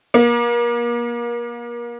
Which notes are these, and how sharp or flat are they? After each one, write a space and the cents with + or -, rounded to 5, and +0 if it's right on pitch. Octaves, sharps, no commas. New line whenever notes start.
A#3 +30